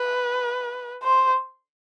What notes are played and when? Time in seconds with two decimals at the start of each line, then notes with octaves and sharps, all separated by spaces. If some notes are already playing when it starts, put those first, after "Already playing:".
Already playing: B4
1.03 C5